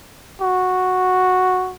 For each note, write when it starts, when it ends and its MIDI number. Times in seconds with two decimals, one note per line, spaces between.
0.41 1.74 66